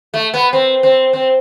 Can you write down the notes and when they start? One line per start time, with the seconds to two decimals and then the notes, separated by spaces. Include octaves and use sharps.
0.14 A3
0.34 B3
0.53 C4
0.83 C4
1.13 C4